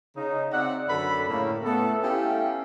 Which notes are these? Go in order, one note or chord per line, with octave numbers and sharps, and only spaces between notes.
C#3 D#4
C4 D5 E5 F#5
F#2 D3 A4 B5
A2 C#3 A#3
A3 B3 A4
C#4 E4 G4 A4 F5 G5